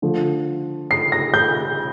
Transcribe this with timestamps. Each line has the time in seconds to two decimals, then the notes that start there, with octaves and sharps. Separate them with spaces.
0.02 D3 F3 A3
0.91 C7
1.12 A#6
1.34 G6